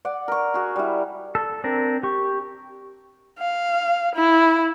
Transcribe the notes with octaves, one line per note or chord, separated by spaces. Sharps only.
D5 F#5
A#4 C#6
F#4 G#4
G3 E4
A4
C4 D4 A#4
G4 C#6
F5
E4